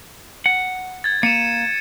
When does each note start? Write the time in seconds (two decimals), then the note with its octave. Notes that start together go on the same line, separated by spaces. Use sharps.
0.46 F#5
1.04 G#6 A6
1.23 A#3 C#7 D#7 E7